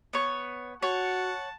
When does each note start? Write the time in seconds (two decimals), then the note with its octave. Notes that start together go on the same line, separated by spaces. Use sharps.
0.13 B3 C#5
0.82 F#4 C#5 F#5 A5